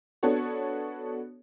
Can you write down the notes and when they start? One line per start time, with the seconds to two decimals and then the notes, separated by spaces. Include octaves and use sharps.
0.23 B3 D4 F#4 A4 C#5